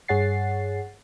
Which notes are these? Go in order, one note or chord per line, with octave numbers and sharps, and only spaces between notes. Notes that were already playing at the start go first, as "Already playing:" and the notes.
G2 G#4 C#5 F#5 A6 C7